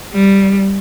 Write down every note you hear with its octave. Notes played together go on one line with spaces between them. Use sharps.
G3